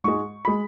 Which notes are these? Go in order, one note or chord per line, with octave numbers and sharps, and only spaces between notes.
G#2 G#3 C#6
G#3 B5